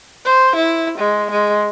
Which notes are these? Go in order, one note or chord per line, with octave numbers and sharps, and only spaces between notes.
C5
E4
G#3
G#3